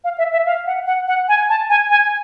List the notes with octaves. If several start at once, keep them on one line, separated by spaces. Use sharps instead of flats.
F5
E5
E5
F5
F#5
F#5
F#5
G#5
A5
G#5
G#5